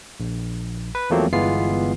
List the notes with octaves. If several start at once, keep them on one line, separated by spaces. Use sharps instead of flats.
A#1
B4
E2 F3 F#3 A3 A#3 C4
G1 E3 G#3 B3 F4 C7